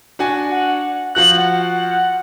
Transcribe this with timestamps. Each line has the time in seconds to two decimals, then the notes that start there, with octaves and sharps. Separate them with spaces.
0.19 D4 F#4 G#5
0.51 F#5
1.15 F3 F#4 F#6 F#7
1.37 F#5
1.68 F#5